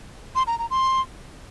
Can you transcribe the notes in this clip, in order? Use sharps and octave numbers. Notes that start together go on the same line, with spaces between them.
C6
A#5
A#5
C6